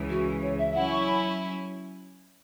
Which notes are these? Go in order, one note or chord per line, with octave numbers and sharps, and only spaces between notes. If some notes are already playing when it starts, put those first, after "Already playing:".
Already playing: C#2 C#3 E3
F#4
C#5
E5
F#3 C#4 E4 F#5
C#6
B5